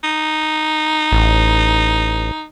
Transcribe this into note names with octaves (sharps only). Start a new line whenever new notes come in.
D#4
A1